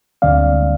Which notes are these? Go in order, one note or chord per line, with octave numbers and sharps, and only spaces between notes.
D2 D3 G3 C4 D5 F5